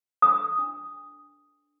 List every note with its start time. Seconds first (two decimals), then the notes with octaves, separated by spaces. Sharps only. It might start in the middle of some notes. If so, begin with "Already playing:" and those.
0.22 D4 D#6
0.59 D4